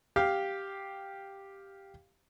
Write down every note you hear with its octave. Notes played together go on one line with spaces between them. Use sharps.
G4 F5